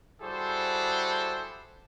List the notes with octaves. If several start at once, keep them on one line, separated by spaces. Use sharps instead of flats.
G3 E4 F#4 G#4 A4 C5